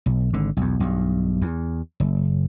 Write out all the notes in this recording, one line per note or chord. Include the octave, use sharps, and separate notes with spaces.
B1
G#1 D3
B1 E2
B1 G2
E2
F#1